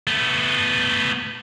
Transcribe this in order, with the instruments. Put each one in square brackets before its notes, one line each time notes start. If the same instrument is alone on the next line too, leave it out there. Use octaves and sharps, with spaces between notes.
[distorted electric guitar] A3 B3